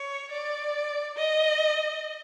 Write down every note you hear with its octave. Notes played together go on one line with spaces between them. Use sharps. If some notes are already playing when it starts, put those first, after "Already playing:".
Already playing: C#5
D5
D#5